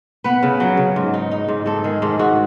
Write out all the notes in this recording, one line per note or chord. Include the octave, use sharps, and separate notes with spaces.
B3 B4
C#3
F#3
C#3
G#2
D#4
D#4
G#2
G#2 A4
D#3 G#4
G#2 A4
G#2 F#4